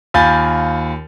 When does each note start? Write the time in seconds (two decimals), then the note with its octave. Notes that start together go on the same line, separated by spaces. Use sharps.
0.14 D#2 F4 G#5 B5 G6 A6